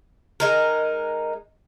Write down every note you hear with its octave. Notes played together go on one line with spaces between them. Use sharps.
G#3 D#4 A#4